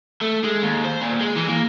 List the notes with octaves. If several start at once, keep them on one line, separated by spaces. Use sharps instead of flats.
A3
G#3
D#2
C5
A#2
G#3
E3
A#3